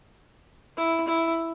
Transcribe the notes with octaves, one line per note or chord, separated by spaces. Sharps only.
E4
E4